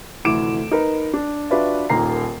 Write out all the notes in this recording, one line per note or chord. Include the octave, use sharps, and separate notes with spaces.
F1 D2 E3 D6 D7 E7
D#4 A#4 B4
D4
D4 F4 F#4 B4 D5 E5
D#1 D#2 A#3 A#5 C7